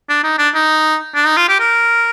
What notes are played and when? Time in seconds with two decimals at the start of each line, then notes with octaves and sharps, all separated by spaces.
0.09 D4
0.24 D#4
0.38 D4
0.55 D#4
1.15 D4
1.26 D#4
1.37 F4
1.49 G4
1.60 A#4